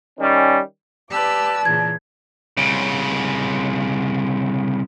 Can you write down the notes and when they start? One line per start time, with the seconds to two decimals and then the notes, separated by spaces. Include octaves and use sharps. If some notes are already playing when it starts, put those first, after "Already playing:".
0.20 D#3 G3 C#4
1.11 G4 B4 D5 A5 E6
1.65 A#2 C#3 E3 G#6
2.57 C2 C#3